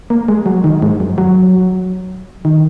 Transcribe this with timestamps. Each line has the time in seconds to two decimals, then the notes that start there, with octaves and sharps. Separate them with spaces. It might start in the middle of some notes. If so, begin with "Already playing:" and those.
0.10 A#3
0.28 G#3
0.46 F#3
0.64 D#3
0.82 G#2
1.00 F#2
1.18 F#3
2.45 D#3